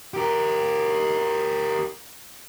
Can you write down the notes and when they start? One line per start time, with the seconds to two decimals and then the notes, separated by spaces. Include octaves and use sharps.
0.14 G4 A#4